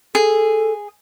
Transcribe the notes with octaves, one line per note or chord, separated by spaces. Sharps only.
G#4 A4